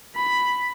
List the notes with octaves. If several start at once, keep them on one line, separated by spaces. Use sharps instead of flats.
B5